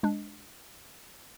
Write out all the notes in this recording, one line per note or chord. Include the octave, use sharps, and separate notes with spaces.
G#3 D4